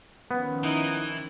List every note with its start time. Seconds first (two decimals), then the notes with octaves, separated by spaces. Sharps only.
0.31 D#3 F3 B3 C#4
0.64 E3 D#4 E4